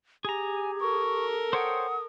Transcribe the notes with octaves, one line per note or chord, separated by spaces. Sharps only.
G4 G#4 G#5 A#5
A4 A#4 C#6
C5 C#5 F#5 G5 D#6